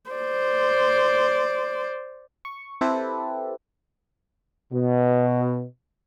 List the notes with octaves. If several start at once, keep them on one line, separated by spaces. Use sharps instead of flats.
C5 D5
C#6
C4 E4 G4 A4 B4
B2